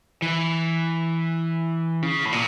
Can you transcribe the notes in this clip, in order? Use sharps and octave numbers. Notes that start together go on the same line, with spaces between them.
E3
C#3
A2
A#2